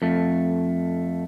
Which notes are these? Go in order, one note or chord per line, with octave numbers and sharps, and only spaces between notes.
F2 A3